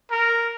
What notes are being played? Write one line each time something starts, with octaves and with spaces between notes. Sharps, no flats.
A#4